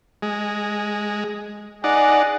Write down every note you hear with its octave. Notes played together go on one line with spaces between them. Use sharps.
G#3
D#4 G#4 D5 F#5